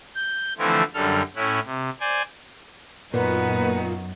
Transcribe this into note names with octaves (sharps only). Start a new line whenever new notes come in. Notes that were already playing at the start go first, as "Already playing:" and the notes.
G6
D3 E3 F3 A3 C4 E4
F#2 D3 G3 A4 F6
A2 C#4 E4 F#6
C3
C5 D5 G#5
F#2 A#2 B3 D#4 F#4 B4